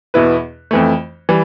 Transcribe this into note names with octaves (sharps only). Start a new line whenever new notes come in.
E2 B2 B3 E4 B4
F2 E3 A3
E3 G3